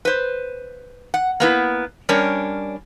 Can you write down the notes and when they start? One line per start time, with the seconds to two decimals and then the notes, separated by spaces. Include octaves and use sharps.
0.05 B4 C5
1.14 F#5
1.40 A#3 B3 E4
2.09 G3 C#4 D4 A#4 C#5